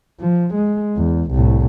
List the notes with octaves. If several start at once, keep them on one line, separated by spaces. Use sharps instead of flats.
F3
G#3
E2
C2 A2